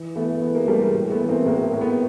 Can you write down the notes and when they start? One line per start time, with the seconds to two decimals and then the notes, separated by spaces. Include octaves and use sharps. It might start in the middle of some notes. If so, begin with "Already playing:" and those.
Already playing: E3
0.16 E3 A3 B3
0.42 E3 A3 B3
0.55 G#3 A#3
0.68 E3 G3 A3
0.81 G#3
0.94 A2
1.12 A3 B3
1.21 E3
1.29 A#3 C4
1.46 A2 G#3 A#3
1.73 A2
1.81 A3 B3